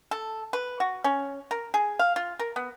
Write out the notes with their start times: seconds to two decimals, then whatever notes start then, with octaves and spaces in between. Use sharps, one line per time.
0.11 A4
0.53 B4
0.80 F#4
1.04 C#4
1.51 A#4
1.74 G#4
1.99 F5
2.16 F4
2.39 A#4
2.56 B3